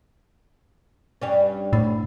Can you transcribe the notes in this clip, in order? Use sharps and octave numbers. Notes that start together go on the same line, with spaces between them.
G2 G3 C#4
D2 A2